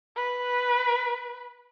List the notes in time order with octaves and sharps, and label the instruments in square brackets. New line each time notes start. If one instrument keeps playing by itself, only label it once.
[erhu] B4